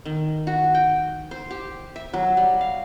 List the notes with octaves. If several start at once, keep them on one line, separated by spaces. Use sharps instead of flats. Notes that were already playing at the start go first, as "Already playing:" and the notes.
D#3
F#4
G5
C5
G4
E5
F#3
G3
F5